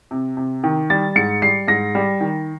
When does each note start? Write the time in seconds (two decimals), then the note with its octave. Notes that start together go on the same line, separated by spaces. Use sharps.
0.11 C3
0.37 C3
0.64 D#3
0.90 G3 A6
1.16 G#2 C#7
1.42 G3 C7
1.68 G#2 A#6
1.95 G3
2.21 D#3